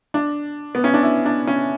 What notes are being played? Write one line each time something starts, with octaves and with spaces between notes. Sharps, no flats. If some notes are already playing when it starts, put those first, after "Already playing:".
D4
B3
C#4
D4
E4
D4
C#4